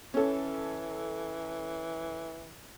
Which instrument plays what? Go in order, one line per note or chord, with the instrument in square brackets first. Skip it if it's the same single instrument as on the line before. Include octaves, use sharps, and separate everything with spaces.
[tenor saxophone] E3 [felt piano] C#4 A4